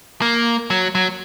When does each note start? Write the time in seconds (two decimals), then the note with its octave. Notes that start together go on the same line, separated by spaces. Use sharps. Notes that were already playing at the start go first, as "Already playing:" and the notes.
0.22 A#3
0.70 F#3
0.95 F#3